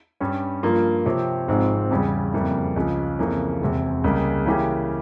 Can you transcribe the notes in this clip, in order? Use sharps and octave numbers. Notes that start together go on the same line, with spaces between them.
G2 G3 C#4
G2 F3 A#3 F4
C3 F3 C4 G4 C#5
G#1 G#2 F3 C4
E2 C#3 G3
F2 C#3 G3 A#3 E4
C#2 C#3 F3
F2 C#3 E3 A#3 C#4
E1 E2 C3
C#2 C#3 G3 A#3
C#3 E3 A#3 C#4 G4